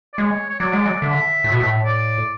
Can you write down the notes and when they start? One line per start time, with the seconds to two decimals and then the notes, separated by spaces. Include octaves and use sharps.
0.13 D5
0.18 G#3 C#5
0.50 C#5
0.60 F#3 D5
0.73 G#3
0.86 F#3
1.01 D3 E5
1.44 A2
1.51 B2
1.60 A2
1.86 D5